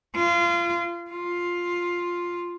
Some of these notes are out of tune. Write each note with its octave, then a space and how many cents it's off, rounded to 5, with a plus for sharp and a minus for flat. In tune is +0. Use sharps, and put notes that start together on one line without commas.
F4 -25
F4 +5